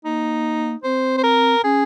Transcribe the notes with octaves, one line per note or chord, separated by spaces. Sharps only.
A#3 D#4
C4 C5
C5
A#4
C#4 G#4